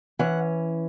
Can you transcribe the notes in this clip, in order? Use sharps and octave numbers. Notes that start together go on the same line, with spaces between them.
E3 C#4 F#5